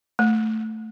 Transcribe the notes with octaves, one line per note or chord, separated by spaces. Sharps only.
A3